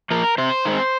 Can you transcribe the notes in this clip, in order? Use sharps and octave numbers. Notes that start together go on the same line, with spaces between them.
F3 A#3 A#4
C3 C5
D#3 G#3 C4